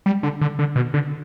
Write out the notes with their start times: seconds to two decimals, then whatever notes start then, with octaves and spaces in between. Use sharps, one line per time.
0.06 G3
0.23 D3
0.41 D3
0.59 D3
0.76 B2
0.94 D3